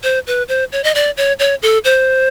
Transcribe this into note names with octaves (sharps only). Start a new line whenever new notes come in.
C5
B4
C5
C#5
D#5
D5
C#5
C#5
A4
C5